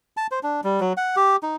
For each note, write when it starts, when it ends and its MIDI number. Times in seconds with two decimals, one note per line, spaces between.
0.17 0.27 81
0.31 0.39 72
0.43 0.61 62
0.64 0.80 55
0.80 0.93 54
0.97 1.16 78
1.16 1.36 67
1.43 1.56 63